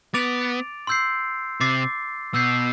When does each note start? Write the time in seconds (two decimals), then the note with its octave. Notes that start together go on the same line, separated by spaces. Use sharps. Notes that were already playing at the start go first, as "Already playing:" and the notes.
0.14 B3 D6 A6 D7 F7
0.87 C6 E6 G6 C7
1.60 C3 D6 A6 C7
2.34 B2 E6 G6 C7